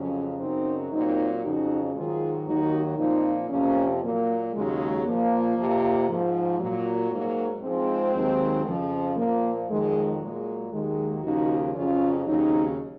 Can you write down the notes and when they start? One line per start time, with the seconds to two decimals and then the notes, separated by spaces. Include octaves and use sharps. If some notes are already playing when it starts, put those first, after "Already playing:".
Already playing: F2 C#3 F#3 C#4
0.39 F#2 C#3 F#3 C4 D#4
0.92 A#2 F#3 C4 D#4
1.43 F2 C#3 F#3 D#4 F#4
1.95 G#2 D#3 F#3 F4 G#4
2.46 D#2 D#3 F#3 D#4 F#4
2.98 A#2 F3 C4 D#4
3.49 F2 C3 F3 A#3 C#4
4.01 A#2 F#3 A#3
4.52 D#2 C#3 F#3 G#3
5.04 A#2 F3 A#3
5.56 F2 C3 F3
6.08 G#2 F3
6.59 A#2 F#3
7.10 G#2 F#3 A#3
7.62 G#2 F3 G#3 C4
8.13 D#2 D#3 F#3
8.66 F2 C#3 F3
9.16 A#2 F3 A#3
9.68 F2 D#3 F#3 G#3
10.20 A#2 F#3 G#3
10.71 D#2 D#3 F#3 G#3
11.22 D#2 C#3 F3 D#4 F#4
11.74 F2 C#3 F#3 C#4 F4
12.26 D#2 C#3 F#3 C4 D#4